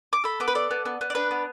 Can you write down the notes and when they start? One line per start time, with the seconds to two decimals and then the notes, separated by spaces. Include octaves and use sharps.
0.13 D6
0.24 A4 B5
0.40 B3 D6
0.48 B4
0.55 A4 D5
0.71 B3
0.85 B3
1.01 B3
1.10 D5
1.15 D4 B4
1.31 B3